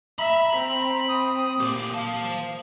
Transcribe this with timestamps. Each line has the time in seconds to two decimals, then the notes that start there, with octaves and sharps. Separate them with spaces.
0.19 E5 A#5 B5
0.55 C4
1.09 D#6
1.60 A#2 A3 G4 D6
1.94 C5 F5 A5